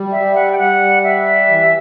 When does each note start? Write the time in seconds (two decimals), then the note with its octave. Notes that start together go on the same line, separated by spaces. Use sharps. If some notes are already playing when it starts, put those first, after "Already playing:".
Already playing: G3
0.12 E5
0.35 F#5
0.52 G5
0.58 G3 F#5
1.04 E5
1.49 E3